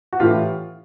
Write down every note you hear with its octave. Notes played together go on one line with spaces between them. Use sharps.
F#4
A2 E3 F4 G4